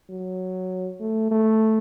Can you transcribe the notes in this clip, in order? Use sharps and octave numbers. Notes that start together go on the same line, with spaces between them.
F#3
A3
A3